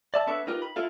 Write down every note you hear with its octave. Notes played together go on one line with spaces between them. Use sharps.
D5 E5 A5
B3 D4 A4 B4 C#5 E5
D#4 F4 G4 A#4 B4
B5
E4 F4 A4 F5